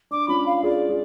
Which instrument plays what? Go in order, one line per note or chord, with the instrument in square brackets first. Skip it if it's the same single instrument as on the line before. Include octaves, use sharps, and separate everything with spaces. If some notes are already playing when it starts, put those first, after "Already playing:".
[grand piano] D4 [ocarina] D6
[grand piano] C#4 F4 [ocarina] B5
[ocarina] F5
[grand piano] F4 G#4 [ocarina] D5
[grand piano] F4 G#4